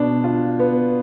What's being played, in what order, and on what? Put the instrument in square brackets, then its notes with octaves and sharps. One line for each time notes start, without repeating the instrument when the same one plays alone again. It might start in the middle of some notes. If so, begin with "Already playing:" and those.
Already playing: [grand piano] B2 D4
F4
B3